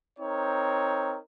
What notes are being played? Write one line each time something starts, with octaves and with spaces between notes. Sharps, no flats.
C4 D#4 A#4 C#5